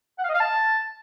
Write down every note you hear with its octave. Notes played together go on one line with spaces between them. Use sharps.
F#5
F5
D#5
F5
A5